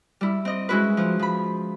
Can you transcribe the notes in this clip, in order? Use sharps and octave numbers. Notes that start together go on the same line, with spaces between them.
G3 E4
C4 D#5
G#3 C#4 E4 F#4 B4
F3
F3 B5